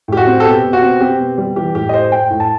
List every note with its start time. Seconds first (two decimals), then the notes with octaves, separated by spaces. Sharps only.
0.08 A2 G4
0.17 F#4
0.27 C4
0.40 A4
0.45 B2 G4
0.64 B2
0.73 F#4
0.82 C4
1.00 C4 G4
1.19 B2
1.38 G3
1.56 E3 G4
1.75 A2 G4
1.89 D#5
1.93 A2 C5
2.12 A2 G5
2.30 A2
2.40 A5